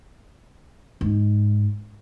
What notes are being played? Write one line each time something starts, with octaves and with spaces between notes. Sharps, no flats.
G#2